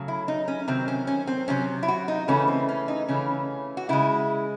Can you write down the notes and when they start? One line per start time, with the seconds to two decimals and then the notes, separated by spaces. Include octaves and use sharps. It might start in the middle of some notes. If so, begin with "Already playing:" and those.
Already playing: C#3 F#3 A3
0.08 E4
0.28 D#4
0.48 C#4
0.68 C3 D#3 F#3 C4
0.88 C#4
1.07 C#4
1.27 C4
1.48 C3 D#3 F#3 C#4
1.83 E4
1.88 F#4
2.08 D#4
2.28 C#3 E3 A3 C#4
2.48 C4
2.69 C#4
2.88 D#4
3.08 C#3 E3 A3 C#4
3.77 F#4
3.89 C#3 G#3 E4